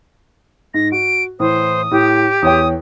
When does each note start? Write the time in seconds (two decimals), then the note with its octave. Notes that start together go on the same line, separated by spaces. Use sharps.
0.74 G#2 A#6
0.92 F#4 D7
1.40 A2 E3 C5 D#6
1.91 A2 G4
2.42 E2 C#5 G5 D#6